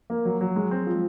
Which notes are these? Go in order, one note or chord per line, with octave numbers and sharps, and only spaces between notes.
A#3
F#3
F#3
G#3
C4
F3